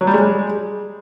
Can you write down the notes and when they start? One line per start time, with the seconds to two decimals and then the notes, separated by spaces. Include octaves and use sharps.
0.01 F#3
0.07 G3
0.14 G#3